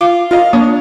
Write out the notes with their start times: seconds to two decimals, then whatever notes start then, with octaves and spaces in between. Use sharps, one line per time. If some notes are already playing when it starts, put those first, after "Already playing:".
0.01 F4 D6
0.31 F4 A#4 D#5 F5
0.53 A#3 D4 C#5 D#6